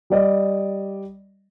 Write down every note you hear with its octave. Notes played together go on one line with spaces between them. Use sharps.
G3 D5 D#5